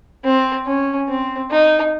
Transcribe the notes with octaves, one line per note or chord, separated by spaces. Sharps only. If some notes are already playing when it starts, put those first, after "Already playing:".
C4
C#4
C4
D#4